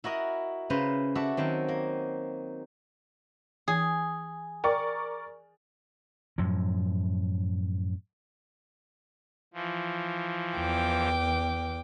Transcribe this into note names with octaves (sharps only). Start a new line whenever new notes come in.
E4 F#4 A#4 D#5
C#3 C#4 B4 C5 A#5 C6
F#4 A4 D5 E5
D#3 F#3 C4
A#3
E3 G#4
A#4 D5 G5 C#6
F#2 A2 F3
E3 F3
E2 G5 D6